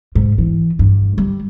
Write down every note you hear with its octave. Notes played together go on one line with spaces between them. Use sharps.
G#2
E3
G2
G3